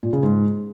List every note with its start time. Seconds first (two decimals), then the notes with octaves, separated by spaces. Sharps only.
0.03 A#2
0.13 C#3
0.23 G#2